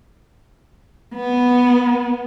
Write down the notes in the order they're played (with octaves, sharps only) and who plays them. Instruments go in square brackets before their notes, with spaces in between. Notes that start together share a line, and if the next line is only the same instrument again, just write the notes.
[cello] B3